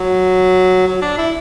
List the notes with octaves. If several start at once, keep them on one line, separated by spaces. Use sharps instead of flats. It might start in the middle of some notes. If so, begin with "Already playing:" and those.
Already playing: F#3
F#3
D4
E4